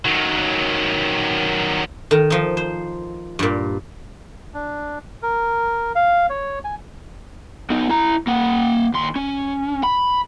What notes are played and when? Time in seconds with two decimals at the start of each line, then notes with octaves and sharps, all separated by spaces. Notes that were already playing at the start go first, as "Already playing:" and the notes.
0.05 D#3 F#3
2.11 D#3 A4
2.30 F3 D#4
2.57 C5
3.39 G2 A#2
4.54 D4
5.22 A#4
5.95 F5
6.30 C#5
6.65 G#5
7.70 B3 D#4
7.89 E4 A#5
8.27 A#3 F#5
8.94 D#2 C6
9.16 C#4
9.84 B5